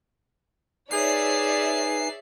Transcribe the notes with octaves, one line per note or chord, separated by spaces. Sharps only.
D#4 G#4 B4 C#5 D5 E5 G#5 C7